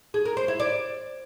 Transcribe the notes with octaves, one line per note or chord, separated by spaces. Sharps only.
G#4
A#4
C5
E4
D5